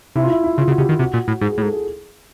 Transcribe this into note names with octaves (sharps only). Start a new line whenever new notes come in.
C3 E4
F4
E4
E4
C#3 F4
C#3 F#4
C#3 G4
D#3 G4
C3 F#4
A#2
A2
G#2 G#4
G#4
A2
G#2 A4
G#4